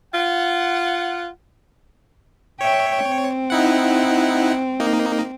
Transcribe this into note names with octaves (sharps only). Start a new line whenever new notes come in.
F4 F#5
C#5 E5 G5
C4
D#4 E4 F#5
A#3 D#4